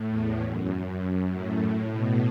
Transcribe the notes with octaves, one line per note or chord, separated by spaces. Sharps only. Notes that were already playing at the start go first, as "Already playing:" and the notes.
Already playing: A2
E2
F#2
F#2
A2
A2
B2